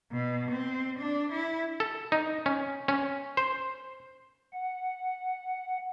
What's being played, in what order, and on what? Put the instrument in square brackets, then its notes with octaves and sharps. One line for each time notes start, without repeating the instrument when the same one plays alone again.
[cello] B2
C4
D4
E4
[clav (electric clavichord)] A4
D#4
C#4
C#4
C5
[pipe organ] F#5